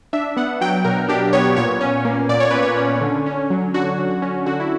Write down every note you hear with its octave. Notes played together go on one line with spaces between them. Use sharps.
D4 E5
B3 F#5
F#3 G5
B2 A#4
D4 G4
B3 C#5
A#2 C#5
C#4
A#3
A#2 D5
C#5
A#2 B4
C#5
C#4
D3
C#4
F#3
D3 F#4
D3
C#4
D3 F#4
E4